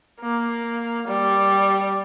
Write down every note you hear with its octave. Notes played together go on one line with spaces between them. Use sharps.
A#3
G3